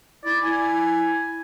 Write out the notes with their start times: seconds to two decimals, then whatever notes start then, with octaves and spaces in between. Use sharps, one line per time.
0.25 E4 D5
0.44 G#5